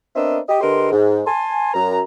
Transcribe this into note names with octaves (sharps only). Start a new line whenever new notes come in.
B3 C4 D4 A#4 D#5 E5
G4 D#5
D3 G4 A#4 B4 D#5 C6
G#2
G#5 A5 C6
F#2 A#5